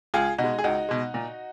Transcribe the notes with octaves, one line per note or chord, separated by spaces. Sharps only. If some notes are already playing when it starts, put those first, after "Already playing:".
C#2 F4 G#4
B2 D#4 F#4
G#3
G#4
C#2 D#4 F#4
B2 G#3
A#2